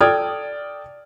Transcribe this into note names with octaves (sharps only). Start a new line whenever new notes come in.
A4 D5 G5 D#6 F6 G#6